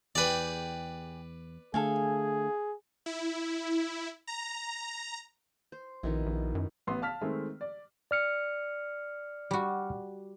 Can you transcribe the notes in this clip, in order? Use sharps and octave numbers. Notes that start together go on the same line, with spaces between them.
E2 G4 G#4 B4 D5 G5
D3 A3 G#4 A4 F5 G#5
E4
A#5
C5
A#1 B2 D#3 E4
A#1
F#2
A1 B3 C6
F5 A5 F6 B6
D#3 G#3 A3 C4
D5
D5 F6 C#7
G3 F#4